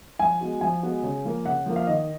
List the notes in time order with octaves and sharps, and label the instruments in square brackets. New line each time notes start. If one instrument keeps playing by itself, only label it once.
[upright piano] F3 [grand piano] G#5
[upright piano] G#3 B3 F#4
[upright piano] F3 [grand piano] G#5
[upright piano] G#3 B3 F#4
C#3
F3 A#3 F4
[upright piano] C#3 [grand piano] F#5
[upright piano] F3 A#3 F4
[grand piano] F5
[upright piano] D#3 [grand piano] D#5